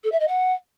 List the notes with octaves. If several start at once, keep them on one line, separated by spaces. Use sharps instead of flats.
A4
E5
D#5
F#5